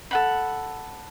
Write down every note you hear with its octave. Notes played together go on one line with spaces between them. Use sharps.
A4 F#5 B5